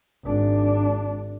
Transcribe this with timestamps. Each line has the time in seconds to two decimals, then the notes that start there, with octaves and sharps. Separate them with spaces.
0.25 G#1 D4